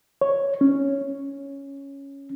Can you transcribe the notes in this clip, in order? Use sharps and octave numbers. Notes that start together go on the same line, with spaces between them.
C#5
C#4